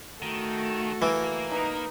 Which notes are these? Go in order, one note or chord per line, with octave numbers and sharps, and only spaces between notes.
D#3 A3 F#4 A4
E3 A#3
D#4 B4